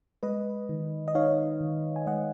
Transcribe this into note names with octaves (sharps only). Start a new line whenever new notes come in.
G#3 B4 D#5
D#3
D#5
D#4 C#5 F5
D#3
G#5
G#3 D#5 F#5